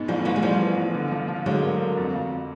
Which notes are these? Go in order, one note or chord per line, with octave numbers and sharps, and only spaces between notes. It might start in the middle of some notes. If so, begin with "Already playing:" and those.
Already playing: G#2 B2
A1 F3 G3
A1 E3 F#3
G#3
A1 F3 G3
E3
A1
D3
F3
F3
D3 F#3 G#3
A#3
D3
F2
F2